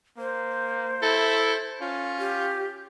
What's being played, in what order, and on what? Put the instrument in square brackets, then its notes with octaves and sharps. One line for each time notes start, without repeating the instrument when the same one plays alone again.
[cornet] A#3 [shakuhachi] C5
[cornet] E4 [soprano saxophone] A4
[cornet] C#4 [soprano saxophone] F4
[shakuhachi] G4